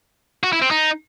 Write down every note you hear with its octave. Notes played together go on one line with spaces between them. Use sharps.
F#4
E4
C4
D#4